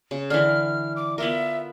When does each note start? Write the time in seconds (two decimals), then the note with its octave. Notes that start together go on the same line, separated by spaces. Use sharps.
0.11 C#3
0.30 D3 E3 F6
0.96 D6
1.18 B3 F4 A#4 E5